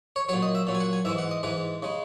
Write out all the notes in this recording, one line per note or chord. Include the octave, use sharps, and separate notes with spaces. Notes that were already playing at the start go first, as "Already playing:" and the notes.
C#5
A#2 F#3 C#5
D#5
E5
A#2 F#3
G#5
F#5
G#5
G#2 E3 G#3 E5
F#5
D#5
G#2 E3 G#3 B4
C#3 G#3